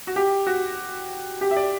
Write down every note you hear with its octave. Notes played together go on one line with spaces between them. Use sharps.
F#4
G4
F#4
G4
E5
D5